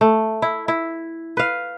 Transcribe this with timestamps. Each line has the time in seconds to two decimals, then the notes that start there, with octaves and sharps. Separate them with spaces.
0.01 A3
0.42 E4
0.68 E4
1.37 B4 F5